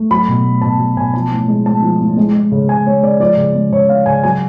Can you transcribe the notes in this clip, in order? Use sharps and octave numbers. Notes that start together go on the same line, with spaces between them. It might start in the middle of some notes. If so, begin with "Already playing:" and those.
Already playing: A3
F#3 B5
B2
A3
B2 A5
F#3
B2 G#5
F3 A5
A2
G#3
A2 A5
F3
A2
G#3
G#3
C#3
C#3 G#5
G#3 C#5
G#3 D5
F3 D5
C#3
G#3
C#3 C#5
F3 F5
C#3 G#5
F#3 G#5